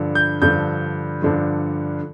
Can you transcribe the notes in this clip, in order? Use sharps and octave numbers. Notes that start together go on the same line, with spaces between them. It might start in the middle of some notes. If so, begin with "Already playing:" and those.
Already playing: G2 D3 F3
G6
G2 D3 F3 G6
G2 D3 F3